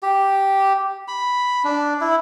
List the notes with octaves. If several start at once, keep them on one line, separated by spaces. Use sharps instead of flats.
G4
B5
D4
E4